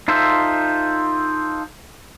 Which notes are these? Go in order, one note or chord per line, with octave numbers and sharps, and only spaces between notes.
D#4 F4 A4 C5 E5